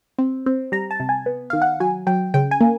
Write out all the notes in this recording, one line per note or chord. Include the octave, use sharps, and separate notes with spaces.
C4
C4
G3 A#5
A5
C3
G#5
B3
D#3 F5
F#5
F#3 G#5
F#3 G5
C#3 G5
G#5
A#3